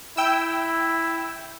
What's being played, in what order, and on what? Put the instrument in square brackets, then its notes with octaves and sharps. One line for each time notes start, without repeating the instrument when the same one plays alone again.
[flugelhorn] E4 [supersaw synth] G5 E6